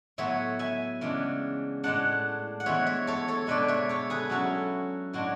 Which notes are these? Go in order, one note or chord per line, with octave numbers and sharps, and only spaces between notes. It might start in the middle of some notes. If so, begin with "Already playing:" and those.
A2 F#3 B3 C#5 E5
E5 G#5
C#3 E3 G#3 D4
A2 G#3 D4 F#5 A5
F#5
E3 G#3 B3 C#5 E5
C#5 E5
A4 C#5
A4 C#5
B2 G#3 B3 D4 B4 D5
C#5 E5
A4 C#5
G#4 B4
F#3 C#4 E4 F#4 A4
A2 G#3 D4 F#4